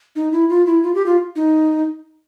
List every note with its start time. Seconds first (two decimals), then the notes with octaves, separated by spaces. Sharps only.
0.16 D#4
0.32 E4
0.49 F4
0.67 E4
0.83 F4
0.95 G4
1.06 F4
1.36 D#4